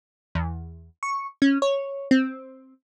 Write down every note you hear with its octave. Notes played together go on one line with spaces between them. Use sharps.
E2
C#6
C#4
C#5
C4